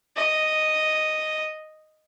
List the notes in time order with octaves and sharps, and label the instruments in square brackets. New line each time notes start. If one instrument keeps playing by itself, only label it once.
[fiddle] D#5